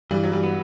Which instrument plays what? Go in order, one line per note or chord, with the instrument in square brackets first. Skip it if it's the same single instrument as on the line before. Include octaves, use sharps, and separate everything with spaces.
[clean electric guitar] G2 [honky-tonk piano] E3 G3
[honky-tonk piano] F#3
E3 G3
[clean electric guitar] B3